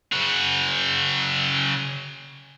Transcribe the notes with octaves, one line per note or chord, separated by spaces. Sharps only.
C#3 F#4